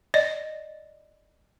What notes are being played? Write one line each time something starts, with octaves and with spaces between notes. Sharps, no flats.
D5 D#5